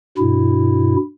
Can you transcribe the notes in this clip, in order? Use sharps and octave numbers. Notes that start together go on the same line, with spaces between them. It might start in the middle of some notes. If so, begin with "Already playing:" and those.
G2 B2 E4